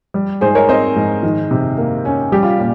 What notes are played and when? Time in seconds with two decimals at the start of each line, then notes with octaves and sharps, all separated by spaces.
0.14 G3
0.41 G#2 G#4 C5
0.55 A#4 C#5
0.69 C4 C5 D#5
0.96 G#2
1.23 D#3
1.51 C3
1.78 A#3
2.05 C#4
2.32 G3 G4
2.43 F4
2.59 A#2